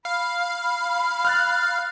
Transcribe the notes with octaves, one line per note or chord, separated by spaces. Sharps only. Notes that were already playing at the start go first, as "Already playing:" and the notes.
F5 B5
F6 F#6 A6